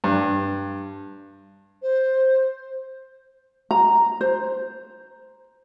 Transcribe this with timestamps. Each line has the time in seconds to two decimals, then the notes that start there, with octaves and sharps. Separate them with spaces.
0.04 G2
1.82 C5
3.71 A#5
4.21 C5